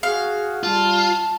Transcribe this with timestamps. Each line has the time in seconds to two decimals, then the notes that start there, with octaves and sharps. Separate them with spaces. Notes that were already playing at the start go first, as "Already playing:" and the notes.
0.03 F#4 G#4 F5
0.63 G3 F4 A5